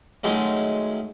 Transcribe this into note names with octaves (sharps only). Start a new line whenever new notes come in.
D#3 F#3 G#3 A3 C#4